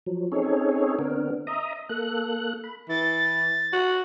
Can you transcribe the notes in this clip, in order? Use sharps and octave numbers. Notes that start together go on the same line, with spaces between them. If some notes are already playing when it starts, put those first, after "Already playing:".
F3 F#3
C4 C#4 D#4 G#4 A4 C#5
D3 B3 C4 D4 A#4
D#5 E5 A#5 D#6
A#3 A4 F#6
B5
E3 A6
F#4